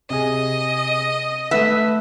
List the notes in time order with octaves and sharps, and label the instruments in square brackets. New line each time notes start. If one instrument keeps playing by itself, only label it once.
[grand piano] C3 G#4 [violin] D#5
[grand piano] A3 A4 B4 [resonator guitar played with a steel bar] E5